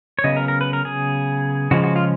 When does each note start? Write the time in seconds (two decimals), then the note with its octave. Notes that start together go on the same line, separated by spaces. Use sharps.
0.19 C#5
0.24 C#3 F#3 B3 D#5
0.36 A#4
0.48 A#4
0.61 B4
0.73 A#4
0.85 G#4
1.71 C#3 F3 G#3 F#4
1.84 F#4
1.96 F4